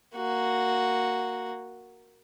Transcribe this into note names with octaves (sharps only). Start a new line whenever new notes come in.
A#3 F#4